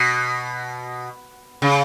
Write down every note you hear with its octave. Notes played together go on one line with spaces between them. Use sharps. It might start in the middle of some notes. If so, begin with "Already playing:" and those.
Already playing: B2
C#3